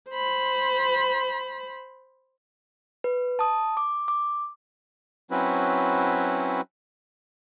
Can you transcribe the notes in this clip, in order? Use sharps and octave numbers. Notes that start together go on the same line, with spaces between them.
C5 B5
B4
A5 D#6
D6
D6
F#3 C4 C#4 E4 F#4 B4